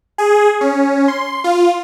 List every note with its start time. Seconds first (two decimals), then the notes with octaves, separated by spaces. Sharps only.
0.18 G#4
0.61 C#4
1.08 C6
1.44 F4